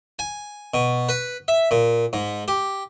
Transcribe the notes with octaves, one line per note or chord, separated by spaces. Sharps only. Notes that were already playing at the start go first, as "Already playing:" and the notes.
G#5
B2
B4
E5
A#2
G#2
G4